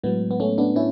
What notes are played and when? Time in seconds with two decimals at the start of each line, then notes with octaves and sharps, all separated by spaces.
0.03 A2 F#3 G#3 B3
0.31 B3
0.40 A3 C#4
0.58 B3 D4
0.76 A2 C#4 E4